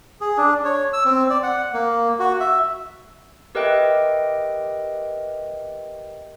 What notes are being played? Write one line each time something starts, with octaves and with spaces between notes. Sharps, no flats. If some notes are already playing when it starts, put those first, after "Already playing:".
G#4
D4
C#5
E6
C4
D5
F#5
A#3
F#4
E5
G4 A#4 B4 D#5 E5 G5